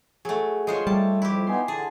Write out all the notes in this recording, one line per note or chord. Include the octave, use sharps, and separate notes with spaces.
F#3 A3 G#4
G#3 F4 C5 C#5 D#5
G3 A3 A5
F2 E4 G4
B3 D#4 G#5 C6
D3 G#4 A5